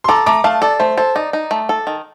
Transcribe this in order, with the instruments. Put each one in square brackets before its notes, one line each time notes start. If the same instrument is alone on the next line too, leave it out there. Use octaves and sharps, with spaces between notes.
[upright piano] C6
[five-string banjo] A4 [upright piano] A#5 D6
[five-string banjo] A3 [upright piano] A#5 D6
[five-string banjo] A3 [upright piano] F5 A5
[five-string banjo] A4 [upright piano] D5
[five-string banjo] A3 [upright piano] C5
[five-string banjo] A4 [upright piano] C5
[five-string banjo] D#4 [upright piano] D5
[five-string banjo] D#4
A3
A4
D#3